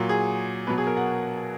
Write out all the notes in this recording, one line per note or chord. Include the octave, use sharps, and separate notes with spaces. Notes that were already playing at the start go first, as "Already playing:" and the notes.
Already playing: A#2 F#3
G#4
B2 F#3 B4
G#4
A#4
F#5